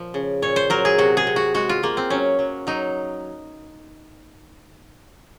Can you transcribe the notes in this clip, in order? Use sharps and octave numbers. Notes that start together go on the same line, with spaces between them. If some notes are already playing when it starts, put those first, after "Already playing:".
Already playing: A#2 F3
C#3
A#2 C#5
C5
F#3 A#4
G#4
C3 F#4
G#4
C3
F#4
G#3 F#4
F4
G#3 A#3
C4
F#3 C#4
F#3
F#3 D#4